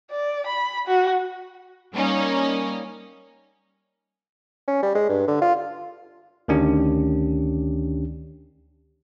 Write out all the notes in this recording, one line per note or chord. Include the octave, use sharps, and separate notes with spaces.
D5
B5
F#4
G3 A#3 C#4 D#4
C#4
G3
G#3
G2
D3
F4
D2 D#3 C#4 D4 G4